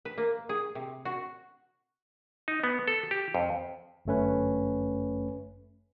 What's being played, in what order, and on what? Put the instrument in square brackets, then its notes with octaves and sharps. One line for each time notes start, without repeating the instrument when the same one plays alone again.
[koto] B4
A#3
G#4
C3
F#4
[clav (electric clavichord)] D#4
B3
A4
G4
F2
[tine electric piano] G1 F#2 A3 C#4 B4